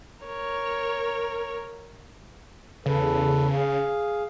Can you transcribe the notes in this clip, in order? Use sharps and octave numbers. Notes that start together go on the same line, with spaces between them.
A#4 C#5
E2 C#3 A4 B4
G#4 F5